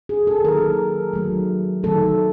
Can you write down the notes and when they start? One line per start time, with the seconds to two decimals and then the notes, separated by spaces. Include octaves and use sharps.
0.09 G#4
0.27 A4
0.45 D#3 F#3 A#3 A#4
1.13 D#3 F#3 A3
1.83 D#3 F#3 A3 A4